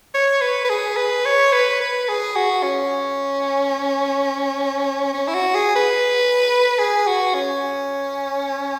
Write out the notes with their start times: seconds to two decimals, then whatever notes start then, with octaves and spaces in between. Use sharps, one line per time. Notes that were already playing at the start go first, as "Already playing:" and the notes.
0.15 C#5
0.41 B4
0.65 B4
0.70 G#4
0.97 B4
1.26 C#5
1.53 B4
1.80 B4
2.09 G#4
2.36 F#4
2.63 C#4
5.14 C#4
5.28 E4
5.34 F#4
5.55 G#4
5.76 B4
6.79 G#4
7.07 F#4
7.34 C#4